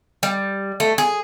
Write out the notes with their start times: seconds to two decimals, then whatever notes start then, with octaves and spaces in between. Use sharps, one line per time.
0.23 G3
0.80 A3
0.98 G#4